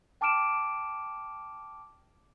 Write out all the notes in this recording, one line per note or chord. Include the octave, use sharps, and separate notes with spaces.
G5 A5 D6 F6 D7 E7